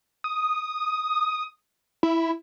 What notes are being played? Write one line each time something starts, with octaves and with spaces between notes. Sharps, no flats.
D#6
E4